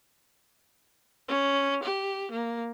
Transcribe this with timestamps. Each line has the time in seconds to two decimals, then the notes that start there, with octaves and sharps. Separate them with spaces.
1.28 C#4
1.83 G4
2.31 A#3